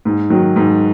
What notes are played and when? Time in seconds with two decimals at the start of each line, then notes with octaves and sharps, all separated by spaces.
0.05 G#2
0.30 D#3 F#3
0.56 G#2